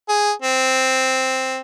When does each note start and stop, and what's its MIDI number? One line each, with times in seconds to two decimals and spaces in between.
0.08 0.32 68
0.42 1.59 60